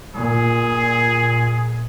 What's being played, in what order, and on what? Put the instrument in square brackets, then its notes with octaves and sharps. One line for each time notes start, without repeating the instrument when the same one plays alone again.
[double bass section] A#2 [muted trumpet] G#4